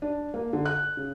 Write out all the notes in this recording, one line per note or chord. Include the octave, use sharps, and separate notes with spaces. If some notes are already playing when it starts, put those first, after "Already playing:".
D4
A#3
D3
F#6
C#3